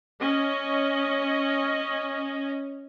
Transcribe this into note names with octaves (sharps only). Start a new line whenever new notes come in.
C#4 D#5